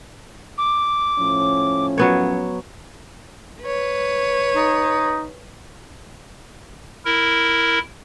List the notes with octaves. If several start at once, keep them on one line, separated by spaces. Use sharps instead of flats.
D6
A2 F3 C#4
F#3 B3 C#5
B4 C#5
D#4
E4 A#4